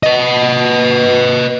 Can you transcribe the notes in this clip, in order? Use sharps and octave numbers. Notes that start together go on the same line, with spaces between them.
B4 D#5